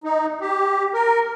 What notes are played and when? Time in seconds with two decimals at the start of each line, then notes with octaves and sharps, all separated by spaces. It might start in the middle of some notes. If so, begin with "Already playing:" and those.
0.04 D#4
0.41 G4
0.94 A#4